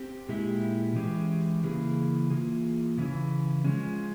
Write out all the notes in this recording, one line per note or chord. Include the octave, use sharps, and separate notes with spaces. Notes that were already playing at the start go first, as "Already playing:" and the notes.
Already playing: C4 G4
A#2 G#3 E4 G4
E3 G#3 C#4 G4
C#3 E3 A#3 E4 G#4
E3 A#3 F4 G#4
C#3 E3 C#4 E4
F3 G#3 C#4